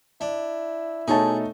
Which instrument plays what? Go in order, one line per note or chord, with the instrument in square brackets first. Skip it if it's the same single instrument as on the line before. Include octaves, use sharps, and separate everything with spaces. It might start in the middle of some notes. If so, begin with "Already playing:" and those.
[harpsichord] D4 [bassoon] E4
[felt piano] B2 C#5 A5 [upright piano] A3 D#4 [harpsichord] G#4